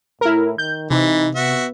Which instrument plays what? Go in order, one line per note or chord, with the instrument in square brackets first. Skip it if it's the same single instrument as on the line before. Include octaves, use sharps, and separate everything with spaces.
[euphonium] A2 [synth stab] E4 A#4
[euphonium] D#3 [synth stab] G6
[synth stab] C3 [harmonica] E3 [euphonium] D#4
[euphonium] B3 [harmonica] F#4 E5